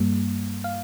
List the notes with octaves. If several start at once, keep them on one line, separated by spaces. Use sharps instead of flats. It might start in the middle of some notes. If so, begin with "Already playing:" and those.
Already playing: G2 G3 A#3
F5